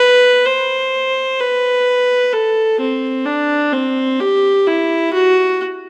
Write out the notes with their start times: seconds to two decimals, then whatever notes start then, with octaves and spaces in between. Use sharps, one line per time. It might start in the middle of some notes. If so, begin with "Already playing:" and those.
Already playing: B4
0.46 C5
1.39 B4
2.33 A4
2.80 C4
3.26 D4
3.72 C4
4.20 G4
4.67 E4
5.13 F#4